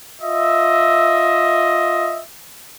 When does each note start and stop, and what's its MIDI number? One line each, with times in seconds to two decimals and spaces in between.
0.21 2.22 65
0.21 2.22 75
0.21 2.22 76